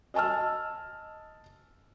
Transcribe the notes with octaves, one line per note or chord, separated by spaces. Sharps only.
D#5 G#5 A5 E6 F6